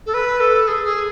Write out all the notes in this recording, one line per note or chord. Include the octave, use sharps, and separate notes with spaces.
A4
B4
A4
G#4
G#4